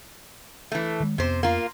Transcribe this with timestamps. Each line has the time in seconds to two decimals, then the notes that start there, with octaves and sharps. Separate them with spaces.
0.72 E3 A3
1.00 D#3 G#3
1.18 F2 C3 B3 C5
1.43 A#3 F4